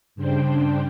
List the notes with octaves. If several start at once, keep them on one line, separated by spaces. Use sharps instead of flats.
G2 C#3 D4 C5 G5